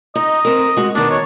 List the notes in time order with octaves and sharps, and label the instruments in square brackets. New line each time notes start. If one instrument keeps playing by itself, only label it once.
[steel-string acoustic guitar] D#4 [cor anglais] D#5
[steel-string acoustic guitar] C4 A#4
G#3 F#4
[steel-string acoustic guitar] B2 D#3 B3 [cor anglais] D4
[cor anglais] C#5